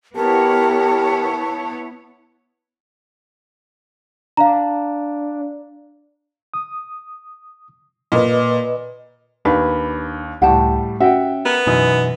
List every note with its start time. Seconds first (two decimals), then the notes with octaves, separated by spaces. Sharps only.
0.16 B3 E4 G4 A#4 C#5 A5
4.37 D4 F5 A#5
6.54 D#6
8.12 A#2 B4 D#5
9.45 D#2 D4 B4
10.42 C#2 A2 G3 F#5 G5 A5
11.00 C#4 F#4 E5 F#5 G5
11.45 B3 A#4
11.67 F#2 B2 E3 D#4